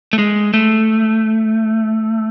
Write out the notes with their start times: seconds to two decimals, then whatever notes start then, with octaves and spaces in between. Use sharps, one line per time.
0.13 A3
0.19 G#3
0.54 A3